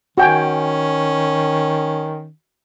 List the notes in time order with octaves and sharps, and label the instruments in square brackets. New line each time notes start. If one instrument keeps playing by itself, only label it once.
[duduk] D#3 [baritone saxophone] C#4 [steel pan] F#4 G5 G#5